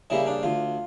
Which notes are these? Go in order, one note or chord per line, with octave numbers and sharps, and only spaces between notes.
C#3 G3 A#3 E4
D4
D2 F4